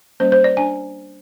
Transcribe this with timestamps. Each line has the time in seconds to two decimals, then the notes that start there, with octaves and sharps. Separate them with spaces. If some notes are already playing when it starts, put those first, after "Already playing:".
0.20 G3 A#3 C#4 C5
0.32 C5
0.44 D5
0.57 D4 G#5